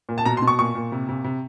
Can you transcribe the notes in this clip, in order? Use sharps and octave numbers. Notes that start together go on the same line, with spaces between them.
A#2
A5
B2 A#5
C6
B2
C#6
A#2 C#6
A#2
C3
C3
C3